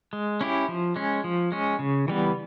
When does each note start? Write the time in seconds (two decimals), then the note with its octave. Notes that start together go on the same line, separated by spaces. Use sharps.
0.13 G#3
0.41 C#4 E4 G4
0.68 F3
0.96 G#3 C#4
1.24 F3
1.52 G#3 C#4
1.79 C#3
2.08 E3 G3 B3